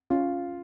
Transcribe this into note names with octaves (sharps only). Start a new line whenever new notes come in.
C#4 F4